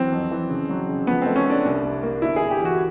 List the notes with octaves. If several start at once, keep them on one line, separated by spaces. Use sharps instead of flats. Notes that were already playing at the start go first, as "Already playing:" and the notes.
Already playing: E3 F#3 C4
F2
E3
C#3
F#3
C#3
F3 B3
A3 C4
C#4
A3 D4
C2
C2
A#3
G1 E4
G1 G#4
G4
E3
F#4